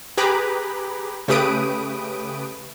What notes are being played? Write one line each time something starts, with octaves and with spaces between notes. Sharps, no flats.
G4 G#4 B4 A#5 B5 D6
C#3 A3 G4 B4 D#6 D7